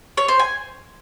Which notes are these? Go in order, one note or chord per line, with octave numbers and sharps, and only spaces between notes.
C#5
C5
G#5